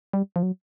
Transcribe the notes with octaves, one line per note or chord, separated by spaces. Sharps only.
G3
F3
F#3